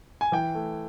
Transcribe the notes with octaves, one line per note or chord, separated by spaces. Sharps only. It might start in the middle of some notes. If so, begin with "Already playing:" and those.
G#5
E3 G5
A3